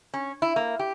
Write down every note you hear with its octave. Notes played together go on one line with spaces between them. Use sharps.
C#4
E4
A#3
G4